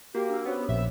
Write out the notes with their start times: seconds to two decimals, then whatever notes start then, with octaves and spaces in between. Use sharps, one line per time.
0.15 A#3 F#4 G4
0.30 D4 E6
0.46 B3 C#4 F#4 C5 C#5
0.69 A#1 B3 E5